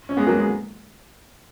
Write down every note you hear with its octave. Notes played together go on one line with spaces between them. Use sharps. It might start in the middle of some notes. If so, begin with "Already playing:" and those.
C#4
G#3 B3
F#3 A#3
G#3